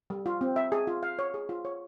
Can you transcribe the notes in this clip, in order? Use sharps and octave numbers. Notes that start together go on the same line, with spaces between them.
G3
F4
C4
E5
G#4
F4
F5
C#5
G#4
F4
C#5